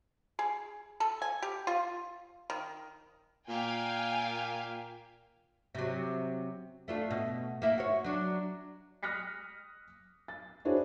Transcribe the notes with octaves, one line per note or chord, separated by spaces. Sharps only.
G#4
A4
G#5
G4
F4
D#3
A#2 F5 G5 G#5
C3 F#3
A3 D4 F4
B2
A#3 E4
F#4 C#5
F#3 D4
D#6 F6 F#6 A#6 B6 C#7
A6
D4 E4 F#4 G#4 C5 C#5